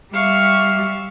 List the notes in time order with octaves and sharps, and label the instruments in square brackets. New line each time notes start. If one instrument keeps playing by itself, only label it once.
[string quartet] G3 E5 [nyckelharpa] F5 C#6